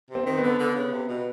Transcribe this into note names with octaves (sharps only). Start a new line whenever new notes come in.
C3 C4
D#3
D3 B3
D3
C#3
C3
B2